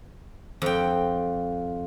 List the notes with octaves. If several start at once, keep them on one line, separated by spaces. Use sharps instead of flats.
F2 G5